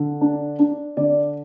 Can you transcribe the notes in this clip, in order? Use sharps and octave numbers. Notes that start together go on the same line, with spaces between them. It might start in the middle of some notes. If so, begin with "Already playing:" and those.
Already playing: D3
D4
D4
D3 D5